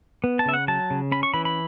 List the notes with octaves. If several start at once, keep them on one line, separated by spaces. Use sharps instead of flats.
B3
A5
C#3 E5
F#5
F#3 A5
C#3
C#4 B5
C#6
E3 B5
B5